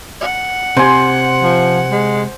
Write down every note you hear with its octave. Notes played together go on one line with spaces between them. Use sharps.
F#5
C3 C5 G#5
F3
G#3